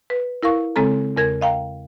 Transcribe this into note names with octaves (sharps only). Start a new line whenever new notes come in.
B4
E4 A#4 F5 C#6
C#3 G#3 C4 A4 A#5
E2 C#3 A#4 G#6
D#5 F5 G5 A#5